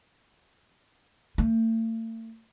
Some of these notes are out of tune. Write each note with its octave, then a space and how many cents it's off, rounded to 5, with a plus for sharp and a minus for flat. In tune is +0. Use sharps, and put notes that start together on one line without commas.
A3 +40